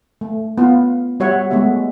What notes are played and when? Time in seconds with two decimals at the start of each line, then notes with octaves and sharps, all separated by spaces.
0.21 A3
0.58 B3 F4 F5
1.20 G3 F#4 C#5 E5 F#5
1.50 G#3 A3 B3 F#4 E5